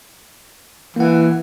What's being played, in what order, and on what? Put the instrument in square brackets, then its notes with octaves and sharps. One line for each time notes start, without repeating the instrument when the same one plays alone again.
[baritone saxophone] E3 [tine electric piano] A#3 F#5